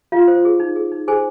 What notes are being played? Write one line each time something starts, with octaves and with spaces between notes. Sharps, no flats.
F4 F5
C5
G#4
D#4
G#4
D#4
G#4 C5 G#5